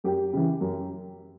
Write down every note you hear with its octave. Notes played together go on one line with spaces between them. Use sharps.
F#2 G4
C#3 E3
F#2